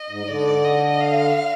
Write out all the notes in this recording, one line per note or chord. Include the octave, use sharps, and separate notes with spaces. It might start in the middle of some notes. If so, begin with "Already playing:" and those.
Already playing: D#5
G#2
D3 D5
D#5
F5